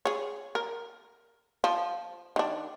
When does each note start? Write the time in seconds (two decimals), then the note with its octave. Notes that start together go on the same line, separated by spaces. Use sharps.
0.05 G#4 C#5
0.55 A#4
1.64 F3
2.36 D#3 D4